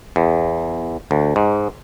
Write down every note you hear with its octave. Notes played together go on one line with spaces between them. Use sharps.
E2
D2
G#2